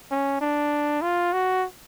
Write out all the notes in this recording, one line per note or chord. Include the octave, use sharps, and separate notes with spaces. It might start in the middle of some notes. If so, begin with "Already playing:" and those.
C#4
D4
F4
F#4